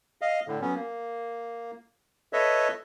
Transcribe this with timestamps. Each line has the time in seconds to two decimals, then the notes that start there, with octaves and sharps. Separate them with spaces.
0.21 D#5 F5
0.48 A2 D3
0.62 F#3 B3 C#4
0.75 A#3
2.33 A4 B4 C#5 D#5 E5